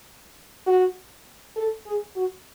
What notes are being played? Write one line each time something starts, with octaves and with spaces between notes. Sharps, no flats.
F#4
A4
G#4
F#4